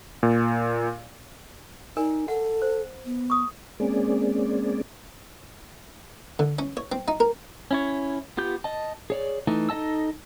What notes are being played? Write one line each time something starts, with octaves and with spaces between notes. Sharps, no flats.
A#2
D#4 A#4 D5 G#5
A4 F#5
C5
B3
C#6 D#6
G#3 A#3 C4 C#4 G#4 D5
D3
C#4
C#5
C4
D#4
A#4
C#4 E4 C#5
B3 F4 G4 G6
D#5 A5
G#4 C#5 D5
E3 A3 D#4
D#4 A4 D#5 A5 E6